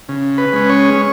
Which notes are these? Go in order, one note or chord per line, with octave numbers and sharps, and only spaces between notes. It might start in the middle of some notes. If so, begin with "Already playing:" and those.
C#3
B4
G#3 C#4
C#5